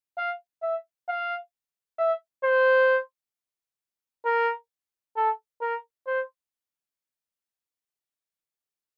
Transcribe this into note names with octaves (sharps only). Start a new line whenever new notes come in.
F5
E5
F5
E5
C5
A#4
A4
A#4
C5